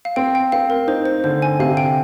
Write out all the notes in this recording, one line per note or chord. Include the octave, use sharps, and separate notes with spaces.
F5
C4 G5
G5
C4 F5
A#4
D#4 C5
C5
D3 C5
G#5
C3 F5
G5